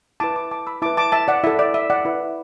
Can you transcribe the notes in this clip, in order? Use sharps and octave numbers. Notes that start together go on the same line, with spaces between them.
E4 B4 A5 D6
A5 D6
A5 D6
B5 E6
E4 B4 A5 D6
A5 D6
E5 A5
D5 F#5
E4 A4 E5
D5
E5
D5 F#5
E4 B4